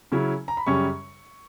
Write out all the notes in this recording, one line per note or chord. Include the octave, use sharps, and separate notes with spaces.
C#3 F#3 C#4 E4
A#5
B5
F#2 C#3 G3 C#4 C#6